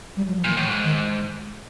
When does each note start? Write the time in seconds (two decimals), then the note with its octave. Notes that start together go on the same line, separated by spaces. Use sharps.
0.17 G3
0.27 F#3
0.38 F3
0.44 A#2 E3
0.57 A2 E3
0.69 G#2
0.84 D#3